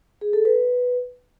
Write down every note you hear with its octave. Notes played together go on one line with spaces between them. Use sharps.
G#4
A4
B4